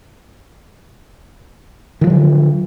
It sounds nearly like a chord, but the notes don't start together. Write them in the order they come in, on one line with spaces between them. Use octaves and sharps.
D#3 F3 F#3 D3